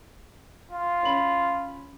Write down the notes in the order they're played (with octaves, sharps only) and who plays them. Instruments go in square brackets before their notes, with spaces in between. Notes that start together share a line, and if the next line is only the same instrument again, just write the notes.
[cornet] F4
[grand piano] C#4 B5 F#7